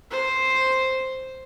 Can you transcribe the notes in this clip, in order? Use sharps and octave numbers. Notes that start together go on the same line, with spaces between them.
C5